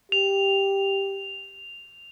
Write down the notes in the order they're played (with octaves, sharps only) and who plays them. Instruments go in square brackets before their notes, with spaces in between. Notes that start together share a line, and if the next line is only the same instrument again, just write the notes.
[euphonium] G4 [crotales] F7